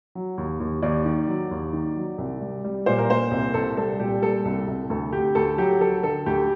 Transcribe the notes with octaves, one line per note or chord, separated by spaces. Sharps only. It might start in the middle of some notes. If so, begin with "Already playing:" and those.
F#3
D#2
D#2
D#2 D5
D#3
F#3
D#2
D#3
F#3
C2
G3
G3
A#2 C5
A#4
A#2 C5
C2
C2 A4
G3 A4
A#2 G4
G3 A4
C2
C2
D2 A4
D2 G4
D2 A4
F#3 G4
F#3 A4
D3 A4
D2 G4